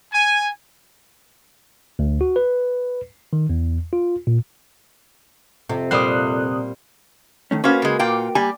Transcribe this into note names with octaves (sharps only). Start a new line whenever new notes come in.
G#5
D2
F#4
B4
D#3
E2
F4
A#2
F2 C3
A#2 G3 C5 D#6 F#6
D#3 A3 C#4
A#3 C#4 F#4 B4 C5 F5
C#3 G#3
A#2 F5 G5
G3 A#3 G#5